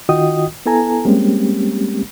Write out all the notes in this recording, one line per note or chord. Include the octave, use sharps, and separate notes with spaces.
D#3 F4 F#4 D#5 G5 D#6
B3 E4 A4 G#5 A#5
G3 G#3 A#3 C4 C#4 G4